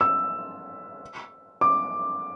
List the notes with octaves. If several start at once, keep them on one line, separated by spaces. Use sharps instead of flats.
E6
D6